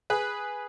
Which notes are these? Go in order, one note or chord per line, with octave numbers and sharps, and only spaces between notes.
G#4 B4